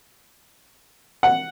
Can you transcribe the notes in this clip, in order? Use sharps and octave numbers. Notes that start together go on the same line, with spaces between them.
F#5